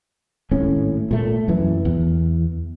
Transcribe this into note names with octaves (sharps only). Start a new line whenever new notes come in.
G#1 A2 C#4
A#2 A3
F#2 E3
E2